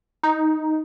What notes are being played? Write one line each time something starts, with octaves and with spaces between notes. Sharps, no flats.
D#4